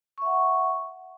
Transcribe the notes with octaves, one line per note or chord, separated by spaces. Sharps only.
E5 F#5 C#6